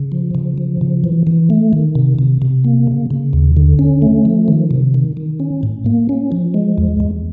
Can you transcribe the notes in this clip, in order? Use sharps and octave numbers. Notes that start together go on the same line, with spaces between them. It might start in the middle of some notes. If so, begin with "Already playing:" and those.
Already playing: C#3
F3
C#3
F3
C#3
E3
E3
A3
D#3
C3
C3
C3
A#3
C#3
C#3
D#2
D3
C#4
A3
F3
D#3
C3
D#3
D#3
C#4
A2
A#3
C#4
F3
G#3
E2
E2